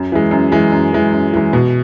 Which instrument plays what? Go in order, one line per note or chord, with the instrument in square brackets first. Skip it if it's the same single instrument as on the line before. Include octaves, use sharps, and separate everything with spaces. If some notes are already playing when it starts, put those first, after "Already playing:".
Already playing: [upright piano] F#2
E3 G#3
F#2
E3 G#3
F#2
E3 G#3
F#2
E3 G#3
B2